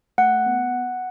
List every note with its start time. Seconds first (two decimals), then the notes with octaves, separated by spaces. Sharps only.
0.18 A3 F#5
0.46 B3